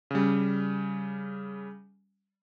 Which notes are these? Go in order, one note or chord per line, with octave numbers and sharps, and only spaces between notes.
C#3 G3